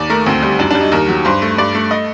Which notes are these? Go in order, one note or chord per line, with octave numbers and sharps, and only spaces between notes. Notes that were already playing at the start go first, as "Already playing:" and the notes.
Already playing: D#2 D5
A3 A#4
D2 C4
G3
F#2 D4
G3 D4
D#4
D#2 A#4
F#3
G2 C5
A3
G2 D5
A3
D#5